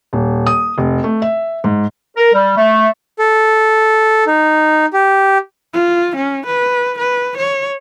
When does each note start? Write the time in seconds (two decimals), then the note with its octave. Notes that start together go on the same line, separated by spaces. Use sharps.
0.13 D#1
0.47 D#6
0.78 F1
1.04 A3
1.22 E5
1.64 G#2
2.17 A#4
2.34 G3
2.57 A3
3.19 A4
4.27 D#4
4.93 G4
5.74 F4
6.16 C#4
6.46 B4
6.98 B4
7.38 C#5